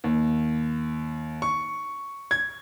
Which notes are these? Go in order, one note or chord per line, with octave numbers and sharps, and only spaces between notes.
D#2
C#6
G#6